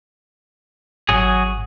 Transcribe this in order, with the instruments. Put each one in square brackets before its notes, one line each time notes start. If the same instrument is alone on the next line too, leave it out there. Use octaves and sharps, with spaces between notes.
[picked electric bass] G#1 [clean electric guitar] F#3 F#4 G#4